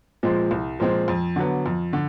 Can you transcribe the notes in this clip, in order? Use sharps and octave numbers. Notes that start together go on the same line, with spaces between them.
A#2 F3 G#3 C4
C2
A#2 F3 G#3 C4
F2
D3 F#3 B3
F2
D3